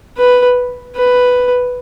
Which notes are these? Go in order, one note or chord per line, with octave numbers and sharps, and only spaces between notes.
B4
B4